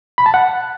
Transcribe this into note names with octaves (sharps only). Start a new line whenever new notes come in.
B5
A5
F#5